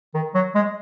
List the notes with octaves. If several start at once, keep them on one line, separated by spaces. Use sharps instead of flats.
D#3
F#3
G#3